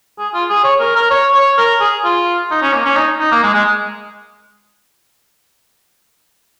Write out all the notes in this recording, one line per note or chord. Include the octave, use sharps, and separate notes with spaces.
G#4
F4
G#4
C#5
A#4
A#4
C#5
C#5
A#4
G#4
F4
D#4
C#4
A#3
C#4
D#4
D#4
A#3
G#3
G#3